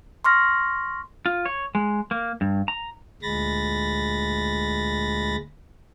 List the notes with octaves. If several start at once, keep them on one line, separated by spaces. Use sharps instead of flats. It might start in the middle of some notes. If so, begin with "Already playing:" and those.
C6 C#6 F6 A#6
F4
C#5
G#3
A#3
G2
A#5
D2 A#2 G#3 B5 A6 A#6